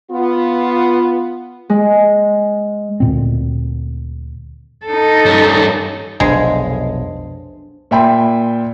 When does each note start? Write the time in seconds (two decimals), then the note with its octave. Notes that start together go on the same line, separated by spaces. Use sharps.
0.11 B3 F4
1.69 G#3
3.00 D2 A#2 C4
4.86 D#4 A4
5.26 G2 C#4
6.20 F1 B1 G#3 D4 C5
7.91 A#2 E5 G5 B5 C6